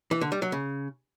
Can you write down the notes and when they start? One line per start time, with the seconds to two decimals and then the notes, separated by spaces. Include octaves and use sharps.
0.11 E3
0.21 D3
0.32 G3
0.42 F#3
0.52 C#3